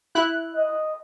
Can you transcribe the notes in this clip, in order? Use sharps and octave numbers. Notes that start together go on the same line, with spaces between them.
E4 F#6
D#5